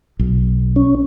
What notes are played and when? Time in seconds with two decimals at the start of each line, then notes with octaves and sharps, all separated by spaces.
0.19 B1
0.76 C#4